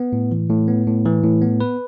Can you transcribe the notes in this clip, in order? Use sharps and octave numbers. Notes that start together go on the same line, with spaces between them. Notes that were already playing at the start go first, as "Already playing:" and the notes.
Already playing: B3
A2
E3
A2
B3
A2
E3
A2
B3
B4